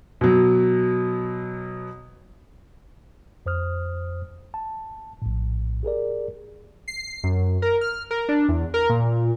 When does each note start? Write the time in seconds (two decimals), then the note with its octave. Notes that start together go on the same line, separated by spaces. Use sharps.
0.21 B2 F#3
3.46 F2 C5 D#6 F6
4.54 A5
5.22 A#1 A2
5.83 G4 G#4 A#4 D5
6.88 C7
7.24 F#2
7.62 A#4
7.81 F6
8.11 A#4
8.29 D4
8.48 E2
8.74 A#4
8.89 A#2